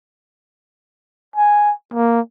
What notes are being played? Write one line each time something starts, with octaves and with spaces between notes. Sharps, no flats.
G#5
A#3